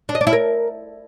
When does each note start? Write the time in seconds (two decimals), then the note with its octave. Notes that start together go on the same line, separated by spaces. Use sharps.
0.09 D4
0.15 D#5
0.21 D4
0.27 E4
0.33 A#4